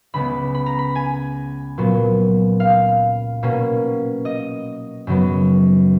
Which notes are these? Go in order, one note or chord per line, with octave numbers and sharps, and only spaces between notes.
C#2 C#3 G#3 B3 B5
B5
A#5
B5
G#5
A#2 F#3 B3
F5
B2 A#3 C#4
D#5
F#2 C#3 F#3 B3